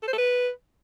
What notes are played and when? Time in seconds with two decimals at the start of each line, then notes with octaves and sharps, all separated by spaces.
0.03 A4
0.08 C5
0.13 A4
0.18 B4